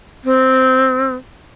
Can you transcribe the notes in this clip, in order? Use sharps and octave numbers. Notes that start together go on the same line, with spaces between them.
C4